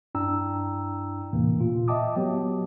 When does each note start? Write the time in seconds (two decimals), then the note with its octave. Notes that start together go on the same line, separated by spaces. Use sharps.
0.15 G2 D4 E4 G5 A#5 E6
1.33 E2 A2 C3 E3 A#3
1.59 A#2 F4
1.88 D#5 E5 G5 A5 D6 D#6
2.16 F#3 B3 G4